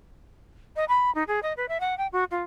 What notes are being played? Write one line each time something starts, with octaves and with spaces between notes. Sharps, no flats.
D#5
B5
D#4
G#4
D#5
B4
E5
F#5
G5
F#4
F4